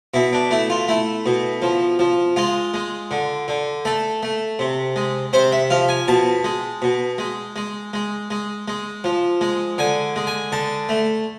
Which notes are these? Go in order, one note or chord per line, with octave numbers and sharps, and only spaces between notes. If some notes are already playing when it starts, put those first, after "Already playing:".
B2 E4
D4
A3 E4
F4
A3 E4
B2
F3
F3
G#3 F4
G#3
D3
D3
A3 A4
A3
C3
G#3
C3 C5
E5
F3 F5
G#5
B2 A5
G#3
B2
G#3
G#3
G#3
G#3
G#3
F3
G#3
D3 G#5
G#3
G#5
D3 A5
A3